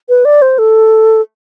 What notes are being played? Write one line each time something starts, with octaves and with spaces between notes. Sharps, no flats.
B4
D5
C5
A4